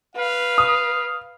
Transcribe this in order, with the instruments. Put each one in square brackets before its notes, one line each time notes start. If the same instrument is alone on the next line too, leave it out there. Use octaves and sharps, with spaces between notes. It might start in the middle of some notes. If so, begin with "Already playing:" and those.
[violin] B4 [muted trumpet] F5
[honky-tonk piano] D#6